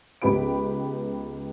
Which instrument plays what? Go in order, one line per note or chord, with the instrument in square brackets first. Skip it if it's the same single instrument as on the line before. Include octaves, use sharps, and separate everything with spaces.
[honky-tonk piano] C#2 B3 G4 B5 D7